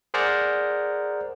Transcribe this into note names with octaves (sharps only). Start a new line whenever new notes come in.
G#4 A#4 C5 D5 F#5 A#5